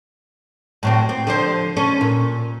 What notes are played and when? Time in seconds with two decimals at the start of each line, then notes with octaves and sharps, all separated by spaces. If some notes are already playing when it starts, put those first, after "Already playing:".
0.83 A2 F#3 C4
1.09 C4
1.27 D3 F3 C5
1.77 C#4 A4
2.01 A#2